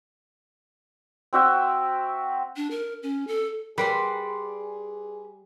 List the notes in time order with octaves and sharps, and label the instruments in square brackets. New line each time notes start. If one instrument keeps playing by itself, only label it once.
[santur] C4 F#4 E5 G5
[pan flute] D4
A#4
C#4
A4
[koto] G3 [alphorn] G#4 [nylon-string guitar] A#4 [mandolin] B4 D5 C6